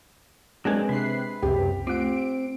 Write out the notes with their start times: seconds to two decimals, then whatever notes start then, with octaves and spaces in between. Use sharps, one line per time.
0.65 F#3 G#3 C4 D4 A#4 B4 G#5
0.89 C3 D4 B4 F#6 C7
1.42 C#2 F#2 C3 G4
1.87 A3 C4 F4 D7